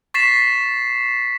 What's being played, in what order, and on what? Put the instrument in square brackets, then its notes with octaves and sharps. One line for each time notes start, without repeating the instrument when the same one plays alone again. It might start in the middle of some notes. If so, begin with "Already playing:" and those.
[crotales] C#6 A6 B6 C7 E7